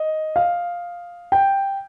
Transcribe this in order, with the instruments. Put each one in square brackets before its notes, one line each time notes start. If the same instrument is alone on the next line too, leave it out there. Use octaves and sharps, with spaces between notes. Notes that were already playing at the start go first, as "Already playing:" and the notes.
Already playing: [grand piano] D#5
F5
G5